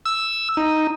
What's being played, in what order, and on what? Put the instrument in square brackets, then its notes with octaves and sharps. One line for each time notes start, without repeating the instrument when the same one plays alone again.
[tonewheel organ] E6
D#4